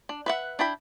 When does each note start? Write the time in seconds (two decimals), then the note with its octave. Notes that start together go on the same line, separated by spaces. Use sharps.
0.09 D4
0.26 B4 E5 F#5
0.59 D4 E4 G5 B5